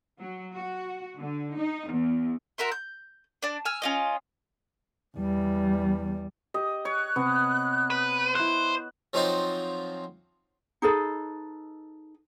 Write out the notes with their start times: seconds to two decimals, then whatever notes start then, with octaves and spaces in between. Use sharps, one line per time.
0.19 F#3
0.55 F#4
1.19 D3
1.58 D#4
1.90 E2
2.58 F#4 A#4 E5 C6
2.72 G6
3.42 D4 D5
3.65 G#5 E6 F6
3.82 C#4 F4 D#5
5.17 E2 G3
6.54 G4 D#5
6.85 C#5 F#6
7.16 C3 B3
7.90 B4
8.35 E4 C5 F#6
9.13 F3 F#3 C4 D#4 F4
10.82 D#4 G#4 A4 B4